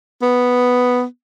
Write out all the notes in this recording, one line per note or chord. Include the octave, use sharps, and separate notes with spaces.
B3